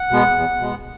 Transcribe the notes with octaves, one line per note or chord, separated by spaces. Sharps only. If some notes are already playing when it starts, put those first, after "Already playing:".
Already playing: F#5
B2 G#3 B3
E2
B2 G#3 B3